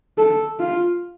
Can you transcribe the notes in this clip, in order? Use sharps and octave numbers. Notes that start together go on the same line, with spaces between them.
A4
F4